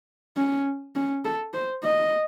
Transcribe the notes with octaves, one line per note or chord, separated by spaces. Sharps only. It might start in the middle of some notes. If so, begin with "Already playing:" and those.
C#4
C#4
A4
C5
D#5